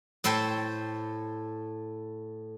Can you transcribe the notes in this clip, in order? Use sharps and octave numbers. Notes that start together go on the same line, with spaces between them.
A2 A4 C5 G5 C6